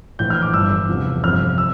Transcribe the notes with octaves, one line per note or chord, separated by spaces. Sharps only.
A#1 A2 E3 G6
F6
D6
G1 G2 E3 E6
E2 C3 F3
G1 F2 C3 F3 F6
E6